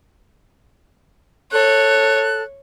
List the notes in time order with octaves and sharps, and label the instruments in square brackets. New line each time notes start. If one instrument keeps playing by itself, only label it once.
[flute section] A4 F#6 [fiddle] C#5